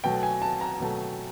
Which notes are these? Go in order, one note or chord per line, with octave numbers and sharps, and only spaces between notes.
B2 F#3 A3 G5
G#5
A5
A#5
B2 F#3 A3